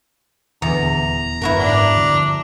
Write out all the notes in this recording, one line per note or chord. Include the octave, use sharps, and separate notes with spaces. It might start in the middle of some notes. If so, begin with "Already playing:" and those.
D#1 E2 D3 A#5
F#1 E4 F#4 A#4
G#2 D4
G2 D3 F3